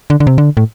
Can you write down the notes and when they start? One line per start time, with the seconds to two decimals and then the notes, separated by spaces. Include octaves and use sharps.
0.10 D3
0.20 D3
0.27 C3
0.38 D3
0.57 A2